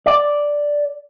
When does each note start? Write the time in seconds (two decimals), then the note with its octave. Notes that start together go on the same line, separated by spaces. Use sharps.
0.06 D5